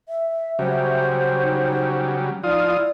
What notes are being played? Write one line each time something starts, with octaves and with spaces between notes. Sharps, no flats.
E5
C#3 F#3 G3 C5
D#4
F3 D#4 F4 D5 D#6
E4